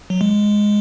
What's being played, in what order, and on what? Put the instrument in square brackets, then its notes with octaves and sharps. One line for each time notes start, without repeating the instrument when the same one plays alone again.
[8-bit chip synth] F#3
G#3